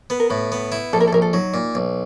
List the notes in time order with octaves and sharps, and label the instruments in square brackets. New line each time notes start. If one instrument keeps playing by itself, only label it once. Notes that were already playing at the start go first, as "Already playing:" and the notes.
[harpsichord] B3 [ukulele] B4
[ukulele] A#4
[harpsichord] A2 [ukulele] B4
[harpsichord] B3
E4
[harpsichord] A#1 [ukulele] A4
[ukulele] A#4
A4
[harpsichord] A#1 [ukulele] A#4
[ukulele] A4
[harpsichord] F#3 [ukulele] D#4
[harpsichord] A#2
B1